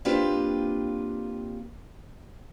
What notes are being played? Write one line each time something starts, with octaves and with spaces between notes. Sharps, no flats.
A#3 C4 D4 F4 G4 B4